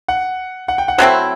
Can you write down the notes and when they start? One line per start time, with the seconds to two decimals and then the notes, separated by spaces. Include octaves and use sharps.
0.08 F#5
0.68 F#5
0.78 G5
0.88 F#5
0.98 F#3 A3 C4 E4 C5